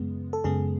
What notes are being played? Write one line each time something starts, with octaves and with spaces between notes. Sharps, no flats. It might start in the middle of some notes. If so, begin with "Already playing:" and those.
Already playing: F#2 C#3 G#3 B3
A4
F#2 C#3 G#3 B3 G#4